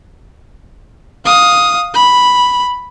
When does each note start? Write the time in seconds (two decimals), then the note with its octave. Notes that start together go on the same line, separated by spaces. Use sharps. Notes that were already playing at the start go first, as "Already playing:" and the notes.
1.25 F5 D#6
1.94 B5